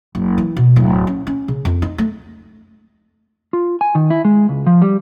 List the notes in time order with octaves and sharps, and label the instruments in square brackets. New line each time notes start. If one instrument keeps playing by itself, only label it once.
[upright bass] F#1
E3
B2
D1
C#4
C#4
C#3
F2
D#4
A3
[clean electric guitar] F4
G#5
D#3
E4
G#3
C#2
F3
G3